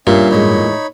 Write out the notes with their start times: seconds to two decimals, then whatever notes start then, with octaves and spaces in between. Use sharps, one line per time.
0.07 G2 A#2 C#4 E5 F5
0.31 E2 A2 G#3 D#4 C#5 B5